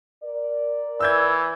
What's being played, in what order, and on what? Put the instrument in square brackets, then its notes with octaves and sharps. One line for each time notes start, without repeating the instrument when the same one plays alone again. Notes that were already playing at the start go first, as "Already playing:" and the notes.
[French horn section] A#4 D5
[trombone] E3 [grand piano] E6 G6 G#6